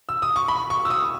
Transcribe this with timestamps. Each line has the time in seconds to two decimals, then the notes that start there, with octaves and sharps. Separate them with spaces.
0.09 E6
0.22 D#6
0.36 C#6
0.48 B5
0.70 C#6
0.85 E6
0.90 D#6